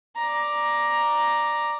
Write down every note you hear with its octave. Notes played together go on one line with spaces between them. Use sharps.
D5 A#5